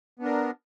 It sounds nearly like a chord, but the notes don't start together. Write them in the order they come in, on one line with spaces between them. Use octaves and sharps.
B3 D4 A#4